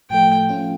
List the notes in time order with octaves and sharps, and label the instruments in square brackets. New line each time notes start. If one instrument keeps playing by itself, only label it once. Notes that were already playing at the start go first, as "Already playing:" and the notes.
[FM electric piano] A2 F3 A3 [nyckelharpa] G5
[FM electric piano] F3 A3 C#4 F4